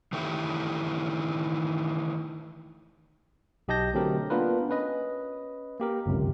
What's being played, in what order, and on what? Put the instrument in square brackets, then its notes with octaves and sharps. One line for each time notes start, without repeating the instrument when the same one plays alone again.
[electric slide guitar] D#3 E3 A3 E4 G4
[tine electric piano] B1 G4 D#5 A5 G6 A#6
D3 F#3 A3 C4 G4 A#4
A#3 B3 D4 F4 A#4 B4
C#4 B4 D#5
A#3 G4 A#4
G1 C#2 F#2 C3